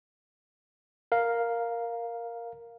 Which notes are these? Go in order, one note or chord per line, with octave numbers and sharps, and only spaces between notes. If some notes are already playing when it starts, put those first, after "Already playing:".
A#4 F5